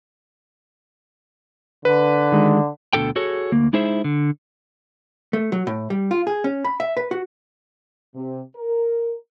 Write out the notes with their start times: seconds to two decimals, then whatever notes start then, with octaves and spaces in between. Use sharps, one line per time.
1.85 D3 B4
2.32 D#3 G#3
2.93 D2 B2 D3 A4 G5
3.16 F#4 G#4 A4 C#5
3.52 D2 A#3
3.73 G#3 D#4 E4 G#4 C5 E5
4.04 D3
5.33 A3
5.52 F#3
5.67 A2
5.90 G3
6.11 F4
6.27 G#4
6.44 C#4
6.64 B5
6.80 E5
6.97 B4
7.11 F#4
8.14 C3
8.56 A#4